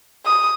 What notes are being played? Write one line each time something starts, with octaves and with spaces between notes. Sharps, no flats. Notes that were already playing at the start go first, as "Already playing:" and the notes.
D#6